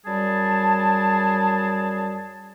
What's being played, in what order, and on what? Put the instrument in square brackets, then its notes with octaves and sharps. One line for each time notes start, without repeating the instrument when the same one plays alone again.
[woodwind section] F#2 G3 G#4 A5